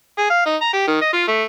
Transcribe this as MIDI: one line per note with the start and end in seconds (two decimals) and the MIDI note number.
0.18 0.28 68
0.30 0.45 77
0.46 0.56 63
0.61 0.69 82
0.73 0.87 67
0.87 0.98 51
1.01 1.10 75
1.13 1.26 65
1.28 1.44 57